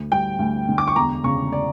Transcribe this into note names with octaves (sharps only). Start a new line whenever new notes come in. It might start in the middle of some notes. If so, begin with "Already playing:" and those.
Already playing: D2
G3 G5
D2
D3
D6
C#6
E1 A#5
C#3 C#6
D5